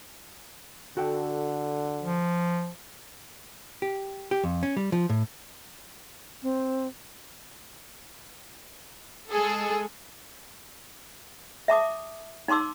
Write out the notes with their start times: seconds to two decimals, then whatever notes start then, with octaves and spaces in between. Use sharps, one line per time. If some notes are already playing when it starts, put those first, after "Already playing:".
0.97 D3 F#4 A4 G5
2.03 F3
3.82 G4
4.31 G4
4.44 F2
4.63 C#4
4.77 G3
4.92 F3
5.09 A2
6.43 C4
9.30 G#3 G#4 A4
11.68 E5 A5 D6 D#6
12.48 D#4 A5 C6 D6 E6